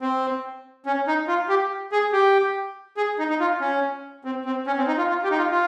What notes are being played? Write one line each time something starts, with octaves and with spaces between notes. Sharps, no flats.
C4
C#4
D#4
F4
G4
G#4
G4
G#4
D#4
D#4
F4
C#4
C4
C4
C#4
C4
D#4
F4
F4
G4
D#4
F4
F4